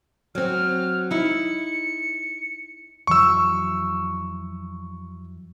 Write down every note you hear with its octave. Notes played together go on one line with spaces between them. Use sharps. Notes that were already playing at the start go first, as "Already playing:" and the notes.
F#3 C4 F6
D#4 E4 C#7
F2 E3 F#3 C#6 E6